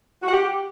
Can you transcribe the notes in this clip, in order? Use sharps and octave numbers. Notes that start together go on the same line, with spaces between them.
F#4
F#5
G4